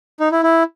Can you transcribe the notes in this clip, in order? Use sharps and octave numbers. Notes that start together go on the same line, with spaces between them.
D#4
E4
E4